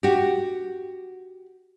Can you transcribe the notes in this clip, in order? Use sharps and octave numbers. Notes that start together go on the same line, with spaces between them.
F#4 G4